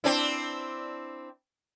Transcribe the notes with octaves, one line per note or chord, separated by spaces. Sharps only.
C4 D4 E4